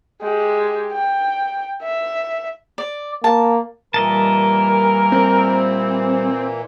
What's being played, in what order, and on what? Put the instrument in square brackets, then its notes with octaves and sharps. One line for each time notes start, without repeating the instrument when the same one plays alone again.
[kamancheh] G#3 G4
G5
E5
[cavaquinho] D5
[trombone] A#3 [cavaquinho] A5
[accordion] A#2 E3 [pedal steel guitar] G3 D#5 A5 [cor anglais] A#4
[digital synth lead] C4